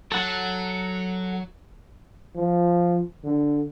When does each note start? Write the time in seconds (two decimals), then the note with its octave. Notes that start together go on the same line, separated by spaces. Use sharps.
0.12 F#3 A4 F#5
2.35 F3
3.24 D3